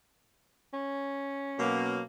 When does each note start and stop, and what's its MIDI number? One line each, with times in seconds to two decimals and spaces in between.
0.74 1.99 61
1.59 2.01 47
1.59 2.01 54
1.59 2.01 58